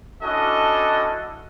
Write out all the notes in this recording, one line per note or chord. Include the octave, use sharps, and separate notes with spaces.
C#4 D4 E4 F#4 A4 D#5